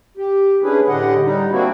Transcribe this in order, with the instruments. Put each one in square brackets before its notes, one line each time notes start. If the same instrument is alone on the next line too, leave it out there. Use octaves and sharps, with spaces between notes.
[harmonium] G4
C#4 D4 E4 G#4 B4
A2 D3 G4 D#5 F#5
G3 D#4
A#3 C4 D4 E4 F#4